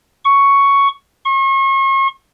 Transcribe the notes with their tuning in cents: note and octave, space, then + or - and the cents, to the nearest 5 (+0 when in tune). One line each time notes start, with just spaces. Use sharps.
C#6 +5
C#6 -40